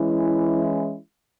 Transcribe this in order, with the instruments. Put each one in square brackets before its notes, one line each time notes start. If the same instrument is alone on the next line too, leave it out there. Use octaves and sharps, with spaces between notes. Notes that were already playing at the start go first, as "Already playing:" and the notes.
Already playing: [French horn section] E3 G#3 C#4 E4